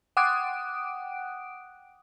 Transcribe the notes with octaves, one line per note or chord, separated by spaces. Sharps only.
F#5 G5 D6 D#6 F#6 D7